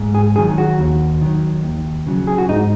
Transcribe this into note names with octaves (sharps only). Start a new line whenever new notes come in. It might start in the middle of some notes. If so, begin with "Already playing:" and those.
Already playing: G#2
G#4
D#3 F#3 G#4
F#4
D#2
D#3 F#3
D#2
C#3 F#3
G#4
F#4
G#2 D#4